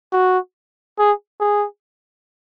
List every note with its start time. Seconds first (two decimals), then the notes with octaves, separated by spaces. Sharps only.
0.13 F#4
0.99 G#4
1.41 G#4